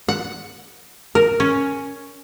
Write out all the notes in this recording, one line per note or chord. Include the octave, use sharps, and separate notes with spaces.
F#5
A#4
C#4